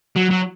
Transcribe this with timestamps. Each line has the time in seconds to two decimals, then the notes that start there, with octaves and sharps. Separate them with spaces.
0.16 F#3
0.30 F#3